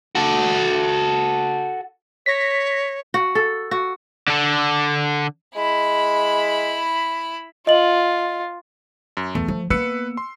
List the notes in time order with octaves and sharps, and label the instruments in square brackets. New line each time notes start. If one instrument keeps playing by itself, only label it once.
[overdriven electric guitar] F#4 A4
[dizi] C#5 [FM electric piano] A#6 B6
[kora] F#4
A4
F#4
[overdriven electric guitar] D3 A4
[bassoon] G#3 [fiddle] E4 B5
[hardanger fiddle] F4 [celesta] D#5 F#7
[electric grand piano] F#2
[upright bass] E2 [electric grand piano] A3
[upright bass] F3
[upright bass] A#3 B3 [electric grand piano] B4 E6 C#7
[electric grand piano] C6